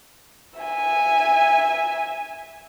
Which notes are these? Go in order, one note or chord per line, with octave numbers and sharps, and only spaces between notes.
E5 G#5